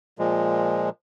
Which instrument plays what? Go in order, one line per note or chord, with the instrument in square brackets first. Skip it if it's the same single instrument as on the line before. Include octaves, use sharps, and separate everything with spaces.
[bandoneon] A#2 F3 G#3